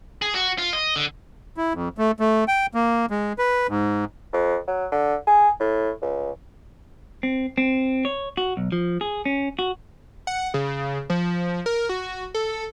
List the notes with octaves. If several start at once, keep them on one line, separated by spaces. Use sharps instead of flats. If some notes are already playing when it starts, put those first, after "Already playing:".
G#4
F#4
F4
D#5
D3
E4
F2
A3
A3
G5
A#3
G#3
B4
G#2
F2
F#3
D3
G#4
A2
C#2
C4
C4
C#5
F#4
B1
F3
G#4
C#4
F#4
F#5
C#3
F3
A#4
F#4
A4